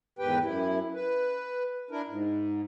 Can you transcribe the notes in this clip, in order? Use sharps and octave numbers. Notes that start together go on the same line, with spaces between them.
E2 G#2 D#3 G4 B4 G5
F#2 E4
B4
D4 E4 A#4
G#2